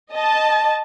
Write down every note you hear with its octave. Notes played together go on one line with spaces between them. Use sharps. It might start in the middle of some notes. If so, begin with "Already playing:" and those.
D#5 A5